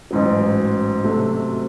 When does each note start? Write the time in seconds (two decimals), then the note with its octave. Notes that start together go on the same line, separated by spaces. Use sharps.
0.11 A1 G#2 F#3
1.04 C3 F#3 A3